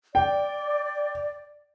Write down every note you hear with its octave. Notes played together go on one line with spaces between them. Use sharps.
D5 G5